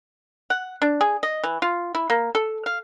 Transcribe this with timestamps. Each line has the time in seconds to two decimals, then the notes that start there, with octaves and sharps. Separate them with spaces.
0.50 F#5
0.82 D4
1.01 G#4
1.23 D#5
1.44 E3
1.62 F4
1.95 E4
2.10 A#3
2.35 A4
2.66 F5